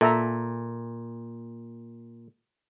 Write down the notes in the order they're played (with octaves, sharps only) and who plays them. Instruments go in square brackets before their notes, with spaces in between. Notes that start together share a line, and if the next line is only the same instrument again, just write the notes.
[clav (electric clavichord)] A#2 [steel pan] A4 E5 A#5